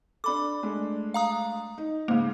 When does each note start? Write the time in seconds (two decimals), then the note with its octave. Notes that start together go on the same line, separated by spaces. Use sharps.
0.24 D4 A4 B5 D6
0.63 G#3 A3 D4
1.14 F5 A#5 D#6
1.78 D#4
2.08 G#2 C#3 A#3